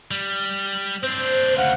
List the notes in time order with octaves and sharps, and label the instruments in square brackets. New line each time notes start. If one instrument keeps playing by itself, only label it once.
[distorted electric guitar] G3
[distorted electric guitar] C4 D4 [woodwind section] C5
[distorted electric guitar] D2 C#3 [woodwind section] C5 F5 F#5